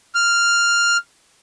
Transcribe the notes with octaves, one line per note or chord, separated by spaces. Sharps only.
F6